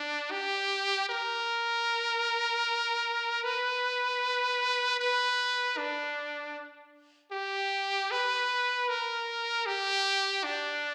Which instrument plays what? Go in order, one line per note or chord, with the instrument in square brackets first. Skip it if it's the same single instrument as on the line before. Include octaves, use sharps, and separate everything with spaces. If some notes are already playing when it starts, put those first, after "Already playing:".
Already playing: [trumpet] D4
G4
A#4
B4
B4
D4
G4
B4
A#4
G4
D4